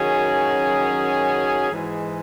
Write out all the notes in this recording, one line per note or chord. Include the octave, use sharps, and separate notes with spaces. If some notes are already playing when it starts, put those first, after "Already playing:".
Already playing: F#2 D#3 F#3 C#4 G#4
G#2 E3 G#3